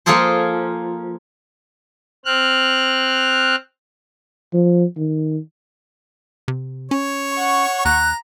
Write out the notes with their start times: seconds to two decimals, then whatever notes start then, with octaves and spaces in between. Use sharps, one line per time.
0.06 F3 A#3 F4 G#4 A4 C5
2.25 C4 F6 F#6
4.53 F3
4.97 D#3
6.48 C3
6.91 C#4 C#5
7.33 F#5 C#6
7.85 D#2 A#5 F#6